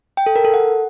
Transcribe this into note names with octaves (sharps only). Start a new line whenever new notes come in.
G5
A4
A#4
A4
F#5